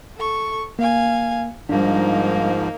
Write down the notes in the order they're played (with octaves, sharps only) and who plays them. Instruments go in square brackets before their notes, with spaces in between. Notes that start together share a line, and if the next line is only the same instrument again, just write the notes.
[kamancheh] A4 C#6
[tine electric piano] A#3 [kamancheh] F5 G#5
[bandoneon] G#2 F3 [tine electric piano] G3 D4 [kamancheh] A#3 D#4